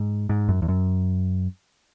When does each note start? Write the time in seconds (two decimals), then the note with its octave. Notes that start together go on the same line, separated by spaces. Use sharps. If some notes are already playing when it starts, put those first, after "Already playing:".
Already playing: G#2
0.29 G#2
0.49 F#2
0.62 E2
0.68 F#2